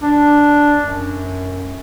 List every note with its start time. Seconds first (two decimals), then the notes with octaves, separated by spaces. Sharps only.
0.02 D4
0.82 F#2